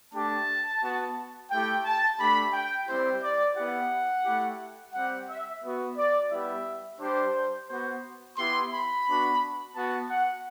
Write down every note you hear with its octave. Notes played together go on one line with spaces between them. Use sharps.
A3 D4 G4 A5
B3 F#4
A3 E4 G4 G5
A5
A3 D4 G4 B5
G5
G3 C4 E4 G4 C5
D5
B3 E4 G4 F#5
A3 E4 G4
G3 C4 G4 F#5
E5
B3 F#4
D5
G3 B3 E4 G4 E5
G3 D4 G4 C5
B3 F#4 C5
B3 E4 G4 C6
B5
B3 D4 F#4
B3 F#4 A5
F#5